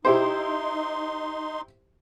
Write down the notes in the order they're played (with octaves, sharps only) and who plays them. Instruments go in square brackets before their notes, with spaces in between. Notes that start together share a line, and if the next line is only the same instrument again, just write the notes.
[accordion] D#4 C6 [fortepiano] E4 G4 C5